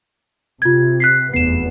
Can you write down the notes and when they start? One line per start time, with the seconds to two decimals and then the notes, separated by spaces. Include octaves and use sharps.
0.62 C3 F4 G#6
1.00 F#6 B6 C7
1.34 F1 E2 B3 C7 E7